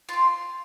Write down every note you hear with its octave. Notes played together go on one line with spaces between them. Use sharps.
C4 F4 C6